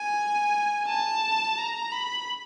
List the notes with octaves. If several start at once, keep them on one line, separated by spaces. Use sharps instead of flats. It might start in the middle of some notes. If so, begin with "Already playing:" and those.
Already playing: G#5
A5
A#5
B5